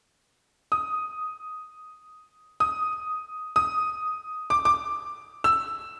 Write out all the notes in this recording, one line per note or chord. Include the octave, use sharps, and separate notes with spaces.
D#6
D#6
D#6
D6
D6
E6